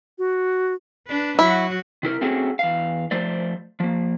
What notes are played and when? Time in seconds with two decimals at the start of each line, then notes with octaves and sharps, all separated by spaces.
0.18 F#4
1.07 D4 B4
1.39 F#3 E4 F#4
2.03 C3 E4 A#4
2.21 A3 C4 C#4 F#4 G#4 A4
2.59 E2 F5
3.11 F3 A3 C5 D5
3.80 F3 A#3